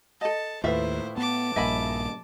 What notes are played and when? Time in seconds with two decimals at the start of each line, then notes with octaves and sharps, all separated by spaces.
0.21 A4 D#5 A5
0.64 D#2 A2 E4 F4 B4 C5 E5
1.18 B3 A5 D6
1.56 A#1 G2 A#3 D#5 E5 G#5 B5 A#6